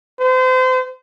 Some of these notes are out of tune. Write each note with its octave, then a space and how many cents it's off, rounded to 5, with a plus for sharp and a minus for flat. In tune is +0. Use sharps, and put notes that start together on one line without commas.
C5 -35